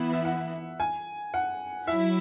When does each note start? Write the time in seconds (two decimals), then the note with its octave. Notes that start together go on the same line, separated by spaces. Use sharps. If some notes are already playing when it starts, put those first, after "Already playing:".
Already playing: E3 B3 E4
0.13 E5
0.25 F#5
0.80 G#5
1.34 F#5
1.87 F#3 E4 E5